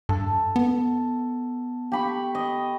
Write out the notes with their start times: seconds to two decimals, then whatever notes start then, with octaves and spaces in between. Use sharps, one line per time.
0.09 G2 A4
0.56 B3
1.92 G4 B5 C#6
2.35 D#5